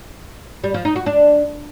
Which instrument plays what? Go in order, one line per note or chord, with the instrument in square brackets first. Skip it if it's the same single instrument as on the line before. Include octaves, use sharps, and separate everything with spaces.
[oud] G3
F3
D#4
F#4
D4